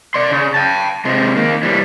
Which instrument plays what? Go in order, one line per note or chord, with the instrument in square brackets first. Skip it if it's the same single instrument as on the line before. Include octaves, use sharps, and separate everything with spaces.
[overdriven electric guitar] D5 C6
C#3
G5 A5
C3 G#3
D#3 A#3
E3 G3